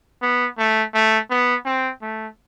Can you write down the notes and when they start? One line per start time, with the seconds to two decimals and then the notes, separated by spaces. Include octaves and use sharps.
0.22 B3
0.58 A3
0.94 A3
1.30 B3
1.65 C4
2.02 A3